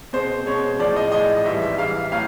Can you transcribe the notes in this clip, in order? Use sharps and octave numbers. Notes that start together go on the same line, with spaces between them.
B2 G#3 C5
B2 G#3 C#5
A2 F3 G#3 D5
D#5
A2 F3 G#3 D#5
G#2 E3 G3 E5
E5
G#2 E3 G3 F5
A2 F#3 F5